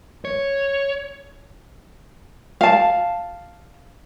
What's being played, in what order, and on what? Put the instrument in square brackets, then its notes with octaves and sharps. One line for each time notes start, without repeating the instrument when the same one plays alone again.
[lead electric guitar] C#5
[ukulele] F5 A5